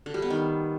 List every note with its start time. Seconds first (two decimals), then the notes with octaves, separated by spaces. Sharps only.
0.06 D3
0.14 G3
0.22 B3
0.30 D#3